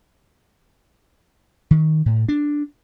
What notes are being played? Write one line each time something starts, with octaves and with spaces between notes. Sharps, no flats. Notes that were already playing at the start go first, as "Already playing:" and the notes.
D#3
A2
D4